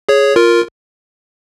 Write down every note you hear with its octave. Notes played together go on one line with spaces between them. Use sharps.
G#4 C#5
F4 A#4